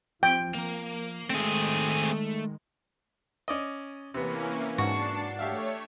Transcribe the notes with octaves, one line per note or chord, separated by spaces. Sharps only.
F3 C4 G5
F3 A#3 A#4
D#3 G#3 A3 C4 G#4
C#4 D5 D#5
C3 E3 A#3 B3 C#4
G#2 D4 F#4 A5 C7
A3 G4 C#5 E5 F5